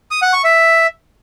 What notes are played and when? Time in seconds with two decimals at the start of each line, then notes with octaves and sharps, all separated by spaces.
0.11 D#6
0.22 F#5
0.33 C#6
0.44 E5